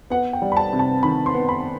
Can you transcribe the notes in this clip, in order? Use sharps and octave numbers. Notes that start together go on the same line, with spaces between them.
B3 F#5
G5
G3
B5
A5
C3
A5
D#3 B5
C6
B3
B5